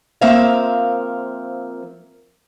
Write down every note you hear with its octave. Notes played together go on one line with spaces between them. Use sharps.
F3 A#3 C4 A#4 E5 F5